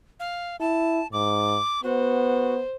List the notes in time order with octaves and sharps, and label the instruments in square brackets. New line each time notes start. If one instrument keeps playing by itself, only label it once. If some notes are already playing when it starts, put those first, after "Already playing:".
[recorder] F5
[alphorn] E4 [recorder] A5
[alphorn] G#2 [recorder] D6
[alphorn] B3 [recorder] F#4 [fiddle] C5